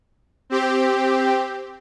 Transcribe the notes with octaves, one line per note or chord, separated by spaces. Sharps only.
C4 G4